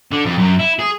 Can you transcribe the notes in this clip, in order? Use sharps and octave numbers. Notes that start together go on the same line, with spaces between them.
D3
F2
F#2
E4
G#4